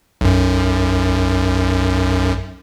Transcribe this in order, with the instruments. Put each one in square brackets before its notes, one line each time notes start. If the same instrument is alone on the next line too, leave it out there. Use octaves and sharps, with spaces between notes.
[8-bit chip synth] B1 F#2